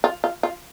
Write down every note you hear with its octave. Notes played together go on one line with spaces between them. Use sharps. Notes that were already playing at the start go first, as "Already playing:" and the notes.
F4
F4
F4